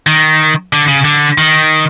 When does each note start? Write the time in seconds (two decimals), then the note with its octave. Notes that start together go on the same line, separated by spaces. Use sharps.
0.07 D#3
0.73 D3
0.88 C#3
1.05 D3
1.38 D#3